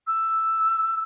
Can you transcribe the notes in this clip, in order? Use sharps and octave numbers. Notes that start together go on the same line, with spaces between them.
E6